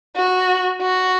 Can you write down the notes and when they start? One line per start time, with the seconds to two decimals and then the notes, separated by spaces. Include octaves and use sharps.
0.16 F#4
0.82 F#4